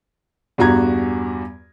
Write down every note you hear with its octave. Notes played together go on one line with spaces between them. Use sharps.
E2 G2 F#4 A#5 G#6